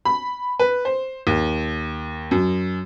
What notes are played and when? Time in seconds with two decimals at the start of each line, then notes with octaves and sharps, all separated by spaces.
0.05 B5
0.59 B4
0.85 C5
1.27 D#2
2.31 F#2